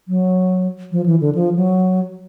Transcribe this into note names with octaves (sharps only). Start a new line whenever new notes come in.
F#3
F3
E3
D3
F3
F#3